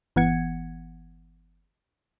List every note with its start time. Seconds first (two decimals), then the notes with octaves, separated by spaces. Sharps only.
0.16 G1 E3 B3 F#5 G#6 C#7